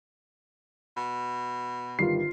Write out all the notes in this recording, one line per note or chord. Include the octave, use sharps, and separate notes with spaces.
B2
G1 D#3 G3 F4 C7